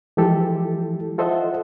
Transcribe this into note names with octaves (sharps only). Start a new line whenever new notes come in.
E3 F3 G#3 E4 G4 A4
F4 A4 C5 D#5 E5 F#5